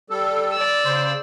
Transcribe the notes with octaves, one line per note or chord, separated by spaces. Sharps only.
G3 A4
D5 E6
C#3 C5